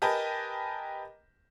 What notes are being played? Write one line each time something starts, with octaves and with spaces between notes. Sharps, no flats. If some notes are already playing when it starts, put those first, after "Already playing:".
G4 A#4 B4 D#5 G#5 A5